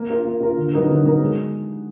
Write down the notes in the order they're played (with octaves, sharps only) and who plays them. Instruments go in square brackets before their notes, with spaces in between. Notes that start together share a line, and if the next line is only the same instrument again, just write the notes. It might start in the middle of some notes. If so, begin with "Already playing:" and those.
Already playing: [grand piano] A#3
F4 A#4
A#3
F4 A#4
D3
F#3 B3 D#4 A#4
D3
F#3 B3 D#4 A#4
G#3